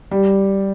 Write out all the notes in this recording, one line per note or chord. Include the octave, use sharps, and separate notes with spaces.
G3